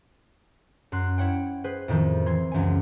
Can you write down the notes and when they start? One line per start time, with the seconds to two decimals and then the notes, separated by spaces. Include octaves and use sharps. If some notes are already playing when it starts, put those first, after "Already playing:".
0.92 F#2 C6 F#6
1.18 E4 C#5 F#5 G5
1.64 G#4 B4 C5
1.88 F2 A2 D#3 F3 C4
2.26 E3 C6 G#6
2.52 C#2 F#2 E3 G#5